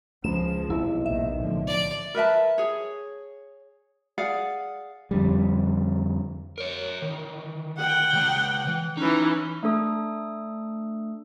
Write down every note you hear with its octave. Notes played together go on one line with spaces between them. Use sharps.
C#2 F3 G#3 E7
B1 C3 E4
A#1 D#2 D#3 E5
A2 D3 F3
F3 D5
A#4 B4 E5 A5
G#4 C#5
G#4 D5 F5 F#5
F2 D3 G3
A#4 C#5
D#3 E3
F#5 G5
C#3 G#3
E3
E3 C#4 D#4
A3 D4 A4 D#6